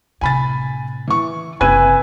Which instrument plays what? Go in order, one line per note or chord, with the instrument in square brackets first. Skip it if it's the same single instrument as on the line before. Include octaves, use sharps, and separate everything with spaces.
[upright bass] A2 C3 [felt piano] G#5 B5 A6
[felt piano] E3 C#6
[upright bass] F#1 [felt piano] C3 E6 G#6 [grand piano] B4 D#7 [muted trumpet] G#5